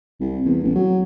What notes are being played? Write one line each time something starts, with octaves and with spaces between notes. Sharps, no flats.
C2
E2
A1
F#3